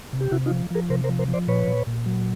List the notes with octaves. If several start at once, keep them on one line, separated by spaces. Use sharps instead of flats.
C3
G4
C3 E4 F#4
D#4 F4
F3
F3 G#4 A#4
C3 A#4 C5
A#4 C5
F3
A#4 C5
F3
C5 D5
A#2 B4 C#5
A#2
A#2
F#3